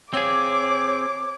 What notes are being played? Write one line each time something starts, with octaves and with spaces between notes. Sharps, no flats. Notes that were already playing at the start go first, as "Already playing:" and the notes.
C4 F4 G4 G#4 C#5 D5 D6